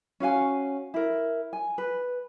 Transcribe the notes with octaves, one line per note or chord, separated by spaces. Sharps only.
C#4 F#4 F5 G#5
E4 A#4
G#5
B4